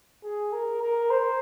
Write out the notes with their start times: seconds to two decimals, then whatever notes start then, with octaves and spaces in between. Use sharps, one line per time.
0.24 G#4
0.53 A#4
0.82 A#4
1.10 C5